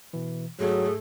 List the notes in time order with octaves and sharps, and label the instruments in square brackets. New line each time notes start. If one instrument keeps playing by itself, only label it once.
[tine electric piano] B2 E3
[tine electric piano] G#2 [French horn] F#3 [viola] A3 [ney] G#4